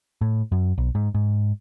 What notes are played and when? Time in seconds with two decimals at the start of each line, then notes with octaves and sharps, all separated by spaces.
0.21 A2
0.52 F#2
0.78 B1
0.95 G#2
1.15 G#2